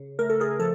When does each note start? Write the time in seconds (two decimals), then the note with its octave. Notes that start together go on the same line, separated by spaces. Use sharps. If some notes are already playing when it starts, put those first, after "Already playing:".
Already playing: C#3
0.19 A3 A#4
0.29 A4
0.40 G#4 A#4
0.60 F3 A4